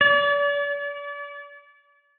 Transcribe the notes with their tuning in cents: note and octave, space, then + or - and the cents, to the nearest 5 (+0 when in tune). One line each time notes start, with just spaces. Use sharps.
D5 -40